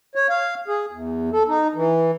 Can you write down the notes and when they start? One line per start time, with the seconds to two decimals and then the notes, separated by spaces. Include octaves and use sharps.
0.15 C#5
0.30 F5
0.68 G#4
0.91 E2
1.33 A4
1.48 D#4
1.75 E3